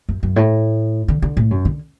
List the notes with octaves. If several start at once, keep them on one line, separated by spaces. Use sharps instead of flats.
F#2
F#2
A2
D3
D3
A2
F#2
D3